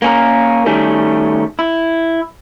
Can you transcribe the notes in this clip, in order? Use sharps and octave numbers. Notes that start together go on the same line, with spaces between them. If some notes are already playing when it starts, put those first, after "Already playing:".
A#3 C#4 A#4
D#3 G3 A3 C#4
E4